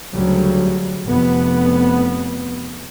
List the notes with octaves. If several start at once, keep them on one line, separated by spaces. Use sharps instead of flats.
D2 C#3 F#3 G3
F1 B3